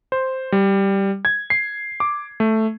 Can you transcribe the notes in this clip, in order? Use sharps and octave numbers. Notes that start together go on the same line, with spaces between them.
C5
G3
G#6
C7
D6
A3